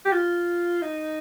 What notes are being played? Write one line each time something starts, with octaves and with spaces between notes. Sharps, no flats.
G4
F4
D#4